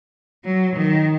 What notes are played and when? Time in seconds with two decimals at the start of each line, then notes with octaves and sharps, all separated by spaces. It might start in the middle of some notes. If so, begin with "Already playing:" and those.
0.44 F#3
0.77 D#3